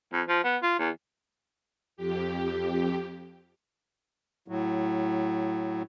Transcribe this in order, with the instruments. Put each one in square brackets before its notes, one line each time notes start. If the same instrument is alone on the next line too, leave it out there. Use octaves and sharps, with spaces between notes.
[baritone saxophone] F2
F3
B3
F4
E2
[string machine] F2 G4
[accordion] A2 F#3